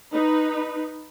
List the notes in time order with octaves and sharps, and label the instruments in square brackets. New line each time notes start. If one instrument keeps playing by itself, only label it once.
[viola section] D#4 B4